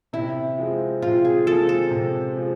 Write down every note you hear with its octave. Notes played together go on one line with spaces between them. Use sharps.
C3 E4
F3 G#3 C4
C3 F4
G#4
F3 G#3 C4 A4
A4
C3
F3 G#3 C4